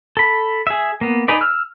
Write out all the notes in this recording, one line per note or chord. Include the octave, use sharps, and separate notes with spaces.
A4 B5
G#4 E5
A#3 B3
D#4 G#4 B4 D5
E6 F6